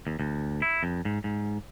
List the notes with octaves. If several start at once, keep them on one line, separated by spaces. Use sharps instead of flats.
D#2
D2
E4
F2
G#2
G#2